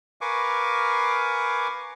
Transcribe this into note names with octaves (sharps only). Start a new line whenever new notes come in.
A#4 B4 F5 G#5 C#6 D6